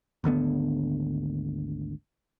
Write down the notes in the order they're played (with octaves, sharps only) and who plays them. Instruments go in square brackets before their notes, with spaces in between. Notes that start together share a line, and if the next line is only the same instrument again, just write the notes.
[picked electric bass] G#1 D2 D3 B3